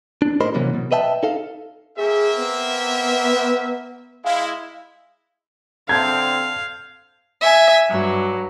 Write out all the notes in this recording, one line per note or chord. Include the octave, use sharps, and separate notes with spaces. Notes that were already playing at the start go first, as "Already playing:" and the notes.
D4
A2 G4 A#4 C5 D#5 B5
C3 E3 F#3 A#3 C#4
B2
B4 D#5 E5 G5 A5
D#4 A4 F5
A#3 C4 G#4 E5
B3
G#3 E4 F5
D3 C4 F5 A5 G6 G#6
E5 G#5
G2 F#3